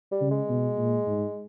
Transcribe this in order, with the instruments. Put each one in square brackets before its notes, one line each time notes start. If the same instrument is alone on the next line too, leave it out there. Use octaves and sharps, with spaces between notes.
[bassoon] G3
[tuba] C#3
[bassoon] G#3
[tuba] B2
A#2
G#2